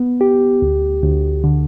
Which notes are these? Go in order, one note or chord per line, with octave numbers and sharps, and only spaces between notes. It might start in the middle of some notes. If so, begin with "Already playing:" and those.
Already playing: B3
G4
D2
D2
D3